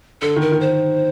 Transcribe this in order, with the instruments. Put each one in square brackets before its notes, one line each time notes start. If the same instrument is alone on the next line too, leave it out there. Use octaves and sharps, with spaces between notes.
[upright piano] D3 [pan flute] A4
[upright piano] D#3
[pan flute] A#4
[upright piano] D#3
[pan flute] C5